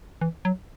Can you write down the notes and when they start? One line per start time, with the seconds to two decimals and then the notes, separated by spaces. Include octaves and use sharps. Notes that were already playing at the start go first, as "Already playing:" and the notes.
0.21 E3
0.45 F#3